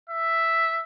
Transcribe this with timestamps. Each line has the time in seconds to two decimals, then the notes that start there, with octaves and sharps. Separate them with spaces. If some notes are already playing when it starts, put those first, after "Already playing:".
0.10 E5